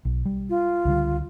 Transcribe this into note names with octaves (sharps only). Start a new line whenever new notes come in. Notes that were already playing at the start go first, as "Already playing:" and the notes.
B1
G3
F4
C#2 D3 G3